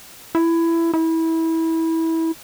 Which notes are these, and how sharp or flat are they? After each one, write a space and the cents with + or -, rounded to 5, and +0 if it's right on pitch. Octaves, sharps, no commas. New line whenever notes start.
E4 +15
E4 -20